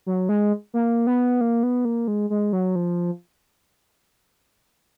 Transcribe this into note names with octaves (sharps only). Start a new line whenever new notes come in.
F#3
G#3
A#3
B3
A#3
B3
A#3
G#3
G#3
F#3
F3